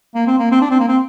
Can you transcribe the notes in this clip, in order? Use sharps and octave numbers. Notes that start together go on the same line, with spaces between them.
A#3
C4
A#3
C4
D4
C4
A#3
C4